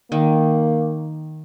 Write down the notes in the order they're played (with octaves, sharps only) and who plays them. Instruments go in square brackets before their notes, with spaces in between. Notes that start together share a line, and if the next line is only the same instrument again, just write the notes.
[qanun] D#3 [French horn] A#3